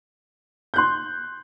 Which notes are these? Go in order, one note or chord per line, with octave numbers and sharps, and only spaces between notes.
C6 F#6 G6